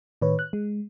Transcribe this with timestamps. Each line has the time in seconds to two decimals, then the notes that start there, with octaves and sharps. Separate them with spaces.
0.22 A2 D#3 B4 C#5
0.39 F#6
0.53 G#3